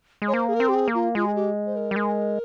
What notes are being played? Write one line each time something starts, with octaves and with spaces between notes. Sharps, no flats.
G#3
C#5
A#3 C5
G#4
A#4
C4
G4
G#4
A#3
F4
G#3 F4
G#4
G4
C5
A#4
G3
G#3